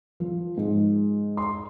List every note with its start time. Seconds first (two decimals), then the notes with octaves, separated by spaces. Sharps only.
0.20 F3
0.57 G#2
1.37 C6